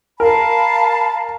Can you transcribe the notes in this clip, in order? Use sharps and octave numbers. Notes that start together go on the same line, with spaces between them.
A#4 F5 A5 B5